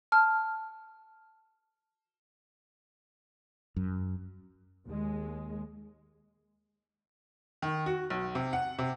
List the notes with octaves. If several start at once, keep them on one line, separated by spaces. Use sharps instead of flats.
A5 F6
F#2
D#2 G#3
D#3
F#4
B1
C3
F#5
C3